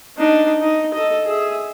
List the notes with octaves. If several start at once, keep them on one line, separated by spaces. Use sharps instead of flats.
D4 D#4
D#4
A4 D#5
G#4 E5